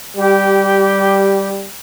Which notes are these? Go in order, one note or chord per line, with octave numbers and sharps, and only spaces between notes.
G3 G4